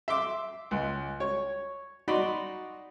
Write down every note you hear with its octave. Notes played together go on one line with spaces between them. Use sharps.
E5 C6 D6
C#2
C#5
D#4 F#4 D5 B5 C6